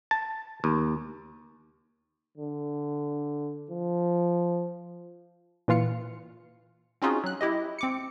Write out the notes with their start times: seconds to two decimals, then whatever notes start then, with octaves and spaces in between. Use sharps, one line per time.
0.11 A5
0.64 D#2
2.38 D3
3.71 F3
5.68 A#2 E3 F4 F5 C#7
7.02 C4 C#4 D#4 F4 F#4 G#4
7.24 F#3 F#6
7.41 E4 G4 D#5
7.78 C4 D6 C#7